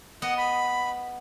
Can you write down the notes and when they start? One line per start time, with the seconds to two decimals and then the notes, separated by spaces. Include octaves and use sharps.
0.22 B3 D#5 F#5
0.37 B5